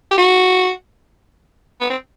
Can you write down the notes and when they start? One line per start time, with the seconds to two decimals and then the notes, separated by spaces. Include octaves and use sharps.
0.11 G4
0.18 F#4
1.81 B3
1.90 C4